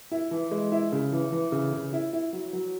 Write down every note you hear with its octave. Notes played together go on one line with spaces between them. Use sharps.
E4
E3
G#3
E4
C#3
E3
E3
C#3
C#3
E4
E4
F#3
F#3